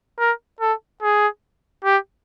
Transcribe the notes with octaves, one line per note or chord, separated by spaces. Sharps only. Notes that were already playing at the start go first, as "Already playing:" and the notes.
A#4
A4
G#4
G4